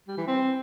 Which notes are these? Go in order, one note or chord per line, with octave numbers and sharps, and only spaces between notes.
G3
E3
C4